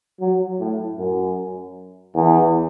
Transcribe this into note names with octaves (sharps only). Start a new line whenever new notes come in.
F#3
A2
F#2
E2